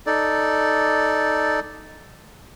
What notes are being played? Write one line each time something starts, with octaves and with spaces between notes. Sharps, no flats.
D#4 A4 D5